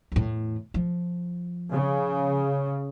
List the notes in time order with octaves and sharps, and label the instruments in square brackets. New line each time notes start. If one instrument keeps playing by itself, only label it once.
[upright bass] E2 A2
F3
[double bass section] C#3